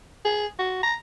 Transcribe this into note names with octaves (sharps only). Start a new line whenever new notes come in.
G#4
F#4
A#5